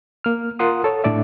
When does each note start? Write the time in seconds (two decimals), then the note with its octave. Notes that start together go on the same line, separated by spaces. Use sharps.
0.24 A#3 F6
0.59 F4 A#4 F#5 C6 D#6
0.84 A4 C#5
1.04 A2 D4 D5 E5